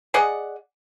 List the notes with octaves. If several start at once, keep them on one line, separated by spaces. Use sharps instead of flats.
G#4 D5 D#5 F#5